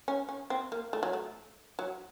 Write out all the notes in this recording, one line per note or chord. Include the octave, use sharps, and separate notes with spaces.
C#4
C#4
C4
A#3
A3
F#3
A3
F#3